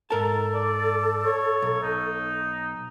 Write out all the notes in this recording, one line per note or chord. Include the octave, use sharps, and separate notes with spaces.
G#2 A4 A#4 A5
D5
C#5
B1
D#4